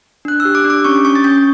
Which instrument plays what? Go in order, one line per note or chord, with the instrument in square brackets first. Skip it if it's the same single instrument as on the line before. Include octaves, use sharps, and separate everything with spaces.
[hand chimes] D4 F#6
E6
G4
D6
D4
D6
C#4 C#6
C#4 C#6
A6
C#4 G6